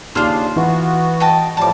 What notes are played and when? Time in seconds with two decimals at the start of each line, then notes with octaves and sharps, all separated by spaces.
0.15 D#2 C#3 D4 F4 C5 F6
0.56 E3 B3 F#4
1.20 D#5 G5 A5
1.57 A2 F3 G3 A5 D6